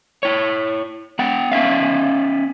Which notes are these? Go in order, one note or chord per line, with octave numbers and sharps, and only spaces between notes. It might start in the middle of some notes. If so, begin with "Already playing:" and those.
E4 C#5
B3 F#5 G5
B3 C#4 E5 F5